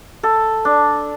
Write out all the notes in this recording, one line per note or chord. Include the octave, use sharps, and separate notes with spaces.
A4
D4